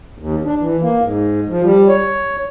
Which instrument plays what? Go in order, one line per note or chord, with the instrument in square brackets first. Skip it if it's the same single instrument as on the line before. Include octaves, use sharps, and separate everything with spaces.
[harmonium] D#2
D4
E3
A#3
G#2
F3
G3
C#5